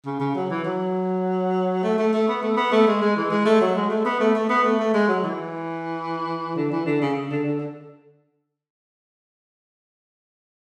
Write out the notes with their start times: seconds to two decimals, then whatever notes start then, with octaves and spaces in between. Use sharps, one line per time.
0.05 C#3
0.19 C#3
0.35 F#3
0.50 E3
0.64 F#3
1.83 A3
1.98 A3
2.13 A3
2.28 B3
2.42 A3
2.57 B3
2.72 A3
2.87 G#3
3.01 G#3
3.16 E3
3.30 G#3
3.45 A3
3.61 F#3
3.75 G#3
3.90 A3
4.05 B3
4.20 A3
4.35 A3
4.49 B3
4.64 A3
4.79 A3
4.93 G#3
5.08 F#3
5.24 E3
6.56 D3
6.71 E3
6.86 D3
7.01 C#3
7.16 C#3
7.31 D3
7.45 D3
7.60 D3